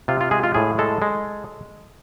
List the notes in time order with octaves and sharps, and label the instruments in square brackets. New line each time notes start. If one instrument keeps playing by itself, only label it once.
[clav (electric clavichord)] C3 F4
F4
G#3 G#4
F4
A2 G#4
G#3 A4
G#3